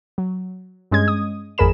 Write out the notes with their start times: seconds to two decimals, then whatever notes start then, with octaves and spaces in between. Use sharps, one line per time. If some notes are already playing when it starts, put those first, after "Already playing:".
0.18 F#3
0.91 G2 G#3 C#4 D#5 G#6
1.08 D#6
1.58 G#1 F2 G#4 A#4 B5 E7